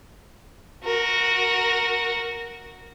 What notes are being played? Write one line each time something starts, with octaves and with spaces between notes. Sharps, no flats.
F#4 A#4